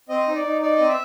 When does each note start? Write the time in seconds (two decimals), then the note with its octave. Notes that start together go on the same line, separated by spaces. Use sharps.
0.09 C4 D#5
0.27 D#4
0.35 D5
0.44 D#4
0.62 D#4 D5
0.76 C4 D#5
0.89 E5